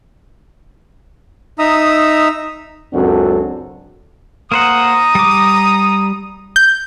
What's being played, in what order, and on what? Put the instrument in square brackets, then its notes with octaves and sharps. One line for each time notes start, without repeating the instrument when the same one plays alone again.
[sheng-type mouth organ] D#4 E5 A#5 D#6 E6
[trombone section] C#2 F#2 C4 D4 F#4 A4
[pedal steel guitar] A#3 C5 F#5 [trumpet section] A#5 D#6
[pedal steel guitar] G3 D6
[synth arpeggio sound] G6